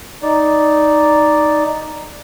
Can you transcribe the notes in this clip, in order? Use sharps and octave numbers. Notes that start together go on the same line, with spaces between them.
D#4 D5